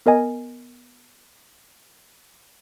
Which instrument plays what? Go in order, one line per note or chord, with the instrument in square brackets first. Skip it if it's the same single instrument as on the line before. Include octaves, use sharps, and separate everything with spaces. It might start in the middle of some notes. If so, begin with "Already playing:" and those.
[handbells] B3 A#4 D#5 G#5